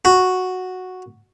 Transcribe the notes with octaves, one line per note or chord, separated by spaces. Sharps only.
F#4